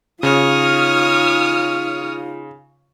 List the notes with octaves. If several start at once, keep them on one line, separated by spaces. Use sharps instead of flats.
C#3 D#4 F4 C#5 D#6 F6